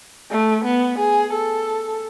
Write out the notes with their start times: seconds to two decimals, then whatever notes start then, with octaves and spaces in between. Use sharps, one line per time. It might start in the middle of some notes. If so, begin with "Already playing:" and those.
0.31 A3
0.65 B3
0.99 G#4
1.33 A4